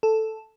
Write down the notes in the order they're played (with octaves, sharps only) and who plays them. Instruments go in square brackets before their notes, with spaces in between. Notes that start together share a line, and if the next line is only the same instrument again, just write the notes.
[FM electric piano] A4